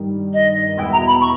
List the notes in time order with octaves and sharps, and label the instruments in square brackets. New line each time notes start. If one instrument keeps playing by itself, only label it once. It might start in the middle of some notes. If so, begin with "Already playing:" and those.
Already playing: [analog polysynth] G2 D#3 G3
[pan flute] D#5
[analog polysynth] E2 B2 G#3 B3 E4 [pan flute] G5
[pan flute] A#5
B5
C#6